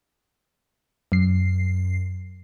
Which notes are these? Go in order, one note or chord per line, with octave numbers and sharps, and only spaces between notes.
F#2 C7